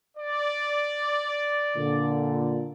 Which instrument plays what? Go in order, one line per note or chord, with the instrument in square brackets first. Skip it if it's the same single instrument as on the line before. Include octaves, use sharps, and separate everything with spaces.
[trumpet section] D5
[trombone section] A#2 D3